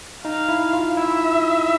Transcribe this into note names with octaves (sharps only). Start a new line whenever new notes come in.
D#4 F5
E4
F4
E4 E5